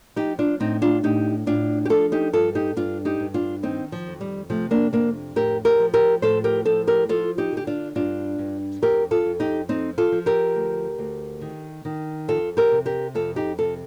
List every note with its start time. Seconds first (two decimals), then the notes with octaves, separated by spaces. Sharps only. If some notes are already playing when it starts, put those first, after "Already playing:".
0.16 F3 D#4 G4
0.39 D4 F4
0.60 A2 C4 D#4
0.82 D4 F4
1.03 A2 D#4 G4
1.46 A2 D4 F4
1.85 G4
1.90 F3 F4 A4
2.12 D#4 G4
2.33 G2 F4 A4
2.55 D#4 G4
2.77 G2 D4 F4
3.05 D#4 G4
3.20 G2
3.34 D4 F4
3.63 D#3 C4 D#4
3.92 F3
4.07 F2
4.21 G3
4.50 C3 F3 A3
4.71 A#3 D4
4.93 F2 A#3 D4
5.36 A2 G4 A#4
5.65 G4 A#4
5.79 F3
5.94 G4 A#4
6.22 A2 A4 C5
6.44 G4 A#4
6.65 F3 A4 C5
6.87 G4 A#4
7.09 F3 F4 A4
7.38 D#4 G4
7.52 D3 G4
7.67 D4 F4
7.95 G2 D4 F4
8.39 G2
8.82 F2 G4 A#4
9.11 F4 A4
9.26 F2
9.40 D#4 G4
9.69 F3 C4 D#4
9.98 F4 A4
10.12 F3
10.26 G4 A#4
10.55 D2
10.98 D2
11.41 D#3
11.85 D#3
12.28 F2 F4 A4
12.57 G4 A#4
12.72 C3
12.86 G4 A#4
13.15 F2 F4 A4
13.36 D#4 G4
13.58 C3 F4 A4